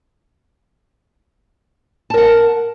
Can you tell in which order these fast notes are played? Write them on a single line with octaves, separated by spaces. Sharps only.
A5 A#4 F#5